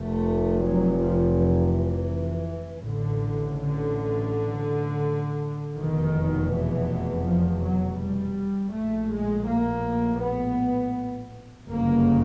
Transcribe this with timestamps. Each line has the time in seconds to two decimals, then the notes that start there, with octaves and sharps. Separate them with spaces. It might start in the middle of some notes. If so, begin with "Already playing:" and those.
Already playing: F1 F2 C3 A3
0.63 F#3
0.99 F3
1.36 E3
2.83 A1 A2 D3
3.58 D3
5.78 F1 E2 B2 D#3
6.51 E3
7.25 F3
7.62 F#3
7.98 G3
8.72 A#1 A2 A3
9.09 G#3
9.46 A#3
10.19 B3
11.67 G1 F#2 C#3 A#3